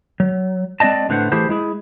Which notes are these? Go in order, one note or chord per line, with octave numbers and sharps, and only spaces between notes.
F#3
G#3 C4 D5 D#5 A5
A2 D3 B4 C5 F#5
E3 A3 E4 G4 G#4 C5
G#3 E4 G#4